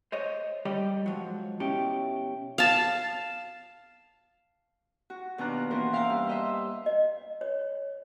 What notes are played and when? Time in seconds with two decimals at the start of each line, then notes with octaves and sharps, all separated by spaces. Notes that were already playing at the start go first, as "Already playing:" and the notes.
0.12 C5 C#5 D#5
0.65 G3 G4 D5 D#5
1.06 G#2 F3 F#3
1.60 B2 C#4 E4 G4
2.58 F5 A5
5.10 F#4
5.38 D#2 B2 D4 F4 A#5 F#6
5.70 E3 A#3 C#4 F#4 A#4 C5
5.93 E5 F5 G5 A#5
6.09 G2
6.27 C5 D#5 E5
6.86 D#5
7.41 C#5